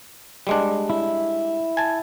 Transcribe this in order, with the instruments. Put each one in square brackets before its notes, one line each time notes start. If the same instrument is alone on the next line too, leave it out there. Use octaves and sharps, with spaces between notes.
[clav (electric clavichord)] G3 G#3 D4
[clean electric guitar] E4
[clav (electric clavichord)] G#5 A5